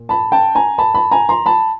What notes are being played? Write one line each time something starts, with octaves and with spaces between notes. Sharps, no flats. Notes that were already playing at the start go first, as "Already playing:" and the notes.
Already playing: A#2
A5 B5
G5 A5
G#5 A#5
A5 B5
A5 B5
G#5 A#5
A#5 C6
A5 B5